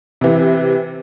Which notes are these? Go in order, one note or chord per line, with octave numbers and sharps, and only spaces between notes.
C3 E3